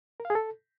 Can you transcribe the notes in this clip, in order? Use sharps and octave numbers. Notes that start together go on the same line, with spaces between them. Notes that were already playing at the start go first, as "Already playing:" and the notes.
A#4
F5
G#4
A4